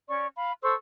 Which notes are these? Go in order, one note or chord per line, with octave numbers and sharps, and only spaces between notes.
C#4 D5 C#6
F5 B5
A4 C5 C#6 E6